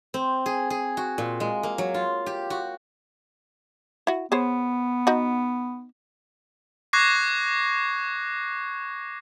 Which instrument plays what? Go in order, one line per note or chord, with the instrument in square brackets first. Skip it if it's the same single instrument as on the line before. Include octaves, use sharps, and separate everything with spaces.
[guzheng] C4
G#4
G#4
F#4
A#2
G#3
A#3
F#3
F4
G4
F#4
[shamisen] E4 F#4
[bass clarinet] B3 [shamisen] G#4 C5 C#5
[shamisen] D#4 F#4
[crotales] C#6 D6 F#6 G#6 A#6 C7